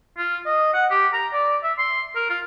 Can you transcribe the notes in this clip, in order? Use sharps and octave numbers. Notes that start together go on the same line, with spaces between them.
F4
D#5
F#5
G4
A#5
D5
E5
C6
A#4
F4